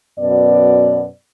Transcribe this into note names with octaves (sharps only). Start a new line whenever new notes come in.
F#2 B2 B3 D5